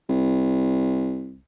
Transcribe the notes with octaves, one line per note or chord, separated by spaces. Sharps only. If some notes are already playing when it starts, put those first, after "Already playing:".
C2